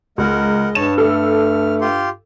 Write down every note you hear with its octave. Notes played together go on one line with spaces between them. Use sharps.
C#2 G#3 A#4 D#5 F#5
G2 C#5 A5 E7
A3 A4 F6
F4 G4 C6